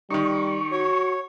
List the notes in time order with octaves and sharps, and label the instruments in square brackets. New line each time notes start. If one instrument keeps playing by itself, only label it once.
[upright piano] D#3 D#4 [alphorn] G3 [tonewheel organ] C#6
[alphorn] F#4 [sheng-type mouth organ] C#5